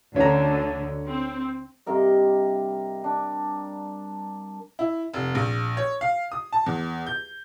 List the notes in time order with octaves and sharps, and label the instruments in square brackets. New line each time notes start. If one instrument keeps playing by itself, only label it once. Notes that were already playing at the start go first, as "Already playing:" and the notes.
[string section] D2 D3 [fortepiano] C#4 A#5
[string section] C4
[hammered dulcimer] G2 C3 A#4 D#5
D4
[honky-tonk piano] E4
F1
A#1
C#5
F5
D#6
A5
E2
G6